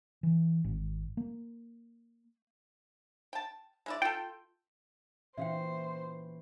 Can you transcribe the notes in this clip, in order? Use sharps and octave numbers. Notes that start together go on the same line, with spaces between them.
E3
G#1
A#3
G5 A5
G#3 E4 D5
F4 A4 G5
A#2 E3 C#4 C5 E5 F5 G5